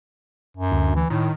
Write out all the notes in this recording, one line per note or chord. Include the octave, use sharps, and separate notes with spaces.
F#2
D2
E3
A2 D#3